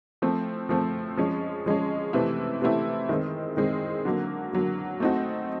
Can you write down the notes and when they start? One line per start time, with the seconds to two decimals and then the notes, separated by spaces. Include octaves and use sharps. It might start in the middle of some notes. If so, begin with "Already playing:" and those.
0.22 F3 A3 C4
0.69 F3 A3 C4
1.17 F3 G#3 C#4
1.66 F3 G#3 C#4
2.13 C3 E3 A3 C4 E4
2.61 C3 E3 A3 C4 E4
3.09 D#3 G#3 C4
3.57 D#3 G#3 C4
4.05 D3 F#3 A#3
4.53 D3 F#3 A#3
5.00 A3 C4 D#4 F#4